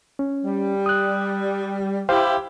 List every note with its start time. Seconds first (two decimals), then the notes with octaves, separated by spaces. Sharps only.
0.19 C#4
0.44 G3
0.86 D#6 F#6
2.09 E4 G4 C5 F5 G5